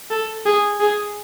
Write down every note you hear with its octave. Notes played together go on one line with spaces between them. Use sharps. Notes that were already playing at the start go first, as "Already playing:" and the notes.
A4
G#4
G#4